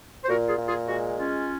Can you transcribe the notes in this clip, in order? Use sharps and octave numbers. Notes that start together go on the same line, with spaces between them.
C5
A#2 F#4 A#4
F4 G#4
A#2
F4 G#4
G#3 F#4
C#4 F4